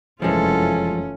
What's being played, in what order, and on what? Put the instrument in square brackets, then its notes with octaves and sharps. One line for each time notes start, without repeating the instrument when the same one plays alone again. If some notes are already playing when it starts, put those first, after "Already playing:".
[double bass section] F1 F#2 E3 [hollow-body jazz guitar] F3 G#3 [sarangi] C#4 [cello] F4 A4